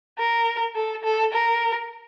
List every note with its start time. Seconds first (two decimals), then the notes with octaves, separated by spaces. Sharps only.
0.18 A#4
0.75 A4
1.04 A4
1.33 A#4